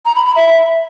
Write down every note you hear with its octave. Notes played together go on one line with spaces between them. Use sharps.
A#5
B5
B5
E5